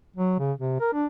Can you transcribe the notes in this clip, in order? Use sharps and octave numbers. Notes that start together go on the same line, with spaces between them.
F#3
C#3
C3
A#4
D4